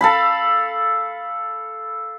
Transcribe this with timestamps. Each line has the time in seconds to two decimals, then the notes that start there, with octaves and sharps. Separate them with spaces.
0.01 A4 F5 B5